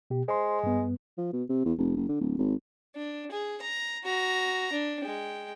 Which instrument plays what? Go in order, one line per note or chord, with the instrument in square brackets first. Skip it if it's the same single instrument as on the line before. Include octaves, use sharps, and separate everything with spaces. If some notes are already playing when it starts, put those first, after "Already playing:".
[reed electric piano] B2 G4
[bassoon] G#3 [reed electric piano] C5 C6
[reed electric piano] G2 B3
[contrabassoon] F3
B2
C3
E2
F1
F#1
D3
D1
G#1
[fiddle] D4
G#4
A#5
F#4 A#5
D4
G#3 G5